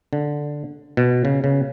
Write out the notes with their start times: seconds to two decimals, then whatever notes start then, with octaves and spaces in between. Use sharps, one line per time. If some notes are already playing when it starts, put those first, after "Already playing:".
0.13 D3
0.97 B2
1.25 C#3
1.44 C#3